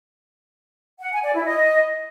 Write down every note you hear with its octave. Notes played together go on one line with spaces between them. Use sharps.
F#5
G#5
D5
E4
D#5